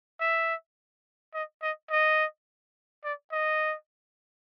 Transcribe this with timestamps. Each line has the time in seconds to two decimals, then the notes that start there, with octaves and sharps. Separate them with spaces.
0.20 E5
1.34 D#5
1.63 D#5
1.91 D#5
3.04 D5
3.32 D#5